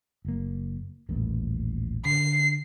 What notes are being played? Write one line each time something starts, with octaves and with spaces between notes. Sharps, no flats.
F#1 A#3
D#1 A1 A#3
D3 C7